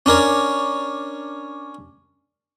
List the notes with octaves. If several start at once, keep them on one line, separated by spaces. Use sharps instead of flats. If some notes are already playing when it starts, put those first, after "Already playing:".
C#4 D4 A#4 C#5